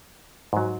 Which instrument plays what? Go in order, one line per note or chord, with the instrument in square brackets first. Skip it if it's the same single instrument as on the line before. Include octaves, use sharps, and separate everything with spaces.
[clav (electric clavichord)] G#2 F#3